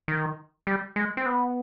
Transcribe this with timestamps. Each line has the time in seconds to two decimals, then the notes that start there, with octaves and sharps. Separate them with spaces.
0.08 D#3
0.67 G3
0.96 G#3
1.17 C4
1.26 B3